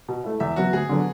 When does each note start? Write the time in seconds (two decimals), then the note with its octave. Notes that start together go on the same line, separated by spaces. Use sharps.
0.08 B2
0.24 A3 E4
0.40 E2 E5
0.56 C#3 F#3 B3 F#4
0.73 D2 G#4
0.89 D3 F#3 B3